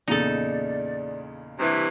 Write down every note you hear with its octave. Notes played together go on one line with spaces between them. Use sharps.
E2 A#2 C#3 D#4 A4 D5
G2 C3 E3